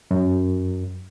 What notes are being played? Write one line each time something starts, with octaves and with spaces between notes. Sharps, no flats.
F#2